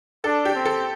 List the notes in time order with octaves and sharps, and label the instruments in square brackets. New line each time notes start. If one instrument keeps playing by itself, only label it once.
[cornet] D4 [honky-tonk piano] A4
[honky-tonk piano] G4
[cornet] C4
[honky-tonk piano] A4